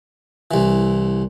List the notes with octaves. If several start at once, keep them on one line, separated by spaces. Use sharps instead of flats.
C2 E3